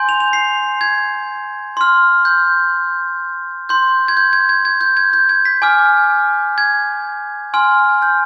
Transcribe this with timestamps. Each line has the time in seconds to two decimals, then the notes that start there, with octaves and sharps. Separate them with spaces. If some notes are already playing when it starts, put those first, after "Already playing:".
Already playing: G#5 C6 G6
0.09 F7
0.20 F7
0.33 C7
0.81 G#6
1.77 C6 F6
2.25 G6
3.69 C6 G6
4.08 G#6
4.17 G6
4.33 G#6
4.49 G#6
4.65 G#6
4.81 G6
4.97 G#6
5.13 G6
5.29 G#6
5.45 B6
5.62 G#5 D6 F6
6.58 G#6
7.54 G#5 C6 F6
8.02 G6